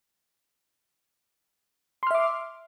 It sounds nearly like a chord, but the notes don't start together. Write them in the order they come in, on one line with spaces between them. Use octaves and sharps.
C6 F6 E5 D6